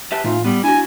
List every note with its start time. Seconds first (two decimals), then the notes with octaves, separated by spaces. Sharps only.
0.12 G4 B4 E5 A5
0.24 A2 E3 A3 D#4 F4
0.44 G3 B3
0.64 D4 E4 F#4 G#5